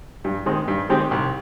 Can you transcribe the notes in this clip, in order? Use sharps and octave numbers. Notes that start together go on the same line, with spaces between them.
G2
D#3 G#3 C4
G2
D#3 G#3 C4 G4
C2